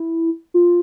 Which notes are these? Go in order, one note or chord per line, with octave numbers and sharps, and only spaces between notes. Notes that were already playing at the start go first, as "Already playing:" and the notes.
Already playing: E4
F4